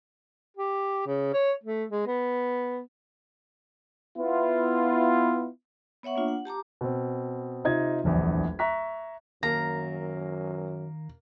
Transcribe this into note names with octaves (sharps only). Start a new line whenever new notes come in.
G4
C#3
C#5
A3
G#3
B3
B3 E4 F4
B3 C#5 E5 F#5 C#6
A#3 D4 F4
F#5
G4 A5 A#5 D6
B2 C4
C3 D#4 F4 D#5 G#6
D1 A#1 E2
E5 A#5 C#6 F#6 B6
F#2 D#3 A#3 A#5